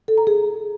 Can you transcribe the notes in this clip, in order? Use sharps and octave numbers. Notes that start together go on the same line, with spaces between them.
A4
A#5
G#4